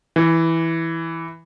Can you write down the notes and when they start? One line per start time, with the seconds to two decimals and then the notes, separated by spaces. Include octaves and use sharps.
0.16 E3